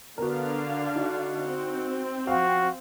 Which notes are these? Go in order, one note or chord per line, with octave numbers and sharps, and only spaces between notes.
D3 B3 D4 F#4 A#4 F5
D#4 F#4
C4
F3 F#4 F5 G5